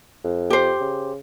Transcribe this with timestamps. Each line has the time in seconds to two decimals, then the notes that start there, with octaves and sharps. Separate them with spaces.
0.24 F2
0.50 G4 C5
0.80 C#3